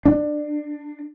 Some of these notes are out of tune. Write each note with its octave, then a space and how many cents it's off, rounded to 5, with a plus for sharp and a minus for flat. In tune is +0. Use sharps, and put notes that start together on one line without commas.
D4 +20